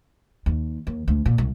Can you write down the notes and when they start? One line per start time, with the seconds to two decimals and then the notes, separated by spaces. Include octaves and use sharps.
0.46 D#2
0.87 D#2
1.08 D2
1.26 A#2
1.38 C2